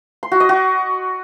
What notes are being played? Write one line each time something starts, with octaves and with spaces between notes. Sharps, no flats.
C6
F#4
D#5
F#4